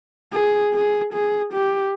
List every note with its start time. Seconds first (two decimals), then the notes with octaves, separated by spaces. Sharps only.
0.33 G#4
0.74 G#4
1.13 G#4
1.53 G4